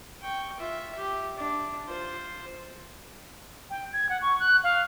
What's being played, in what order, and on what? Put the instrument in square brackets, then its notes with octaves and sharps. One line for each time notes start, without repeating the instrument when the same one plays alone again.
[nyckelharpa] G5 C#6
F4 E5
G4
D4
F4 C5
[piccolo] G5
G#6
F#5
C#6
F#6
F5